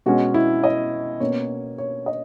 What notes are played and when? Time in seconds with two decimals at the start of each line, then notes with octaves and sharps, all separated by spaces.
0.06 B2 G#3 C#4 F#4
0.34 E4
0.64 D#5
1.20 B2 A#3 C#4 C#5
1.78 C#5
2.06 D#5